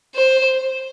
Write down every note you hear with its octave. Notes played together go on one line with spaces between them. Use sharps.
C5